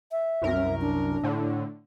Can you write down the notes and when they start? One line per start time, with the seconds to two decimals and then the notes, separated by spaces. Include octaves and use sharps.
0.12 E5
0.42 C2 F#2 A#4
0.81 D4
1.23 A2 D3